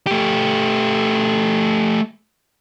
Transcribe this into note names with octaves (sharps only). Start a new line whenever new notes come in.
A3 G4